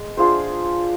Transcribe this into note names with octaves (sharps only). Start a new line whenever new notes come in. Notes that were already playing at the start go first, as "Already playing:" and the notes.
Already playing: G#3
D4 F4 G#4 C5